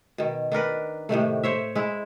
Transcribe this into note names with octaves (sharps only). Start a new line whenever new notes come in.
B2 D#3
D#3 D4 A#4 B4
A2 C3 D#3 A3
C5 C#5 E5
G#3 E4